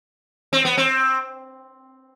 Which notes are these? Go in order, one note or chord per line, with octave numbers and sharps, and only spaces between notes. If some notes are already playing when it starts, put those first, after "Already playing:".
C4
B3
C4